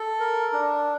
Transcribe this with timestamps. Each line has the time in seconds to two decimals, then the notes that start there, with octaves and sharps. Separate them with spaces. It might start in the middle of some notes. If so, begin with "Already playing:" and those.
Already playing: A4
0.20 A#4
0.53 D4